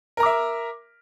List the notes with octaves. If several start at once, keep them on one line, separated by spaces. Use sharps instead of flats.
A#4 E5 A#5 D6